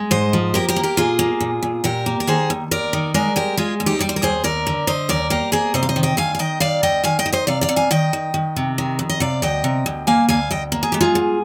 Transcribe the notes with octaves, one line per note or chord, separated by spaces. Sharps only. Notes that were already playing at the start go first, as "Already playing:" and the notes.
Already playing: G#3
G#2 C5 D#5
F3
A#3 G4 A#4
G4 A#4
A#3
G4 A#4
A#2 F4 G#4
A#3
A#2
A#2
A#2 G4 A#4
A#3
A#4
D#3 G#4 C5
D#2
D#2 A#4 D5
D#3
G#3 A#4 D5
G#3 G4 A#4
G#3 F4 G#4
D#2
D#4 G4
G3 D5
C5
A#4
D#2 G#4 C5
D#2 A#4 D5
D3
D3 C5 D#5
D#2 A#4 D5
A#3 G4 A#4
A#3 G#4 C5
C3 C5 D#5
F5
C5 D#5
D#3
D#5 G5
D2 F5 G#5
F5
D#3 D#5 G5
D#3 D5 F5
D2 D#5 G5
D#3 F5 G#5
D#5 G5
D#3
C5 D#5
C3 D5 F5
D5 F5
C3
F5 G#5
D#3 D#5 G5
D#3
D#3
C3
D#3
F2
D#5
C3 D5 F5
D2 D#5 G5
C3
D2
A#3 F5 G#5
D2 F5 G#5
D2 D#5 G5
A#3
G#4
G#3 G4
F4 G#4
G#2